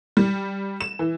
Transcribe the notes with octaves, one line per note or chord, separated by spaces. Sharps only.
G3
E7
E3